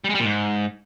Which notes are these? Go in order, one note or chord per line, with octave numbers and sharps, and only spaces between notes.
G3
G#3
G3
A#2
G#2